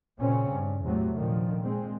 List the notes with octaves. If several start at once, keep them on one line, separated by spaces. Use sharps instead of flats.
A#2 C#3 C4 C#4
G2
E2 A2 C3 F#3 A3
A#2 D3 D#3 F3
A#2 G#3 C4